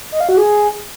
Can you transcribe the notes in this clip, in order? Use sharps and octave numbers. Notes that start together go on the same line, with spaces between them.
D#5
F5
F#4
G#4